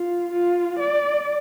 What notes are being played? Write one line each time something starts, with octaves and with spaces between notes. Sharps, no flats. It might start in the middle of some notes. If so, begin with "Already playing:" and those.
Already playing: F4
F4
D5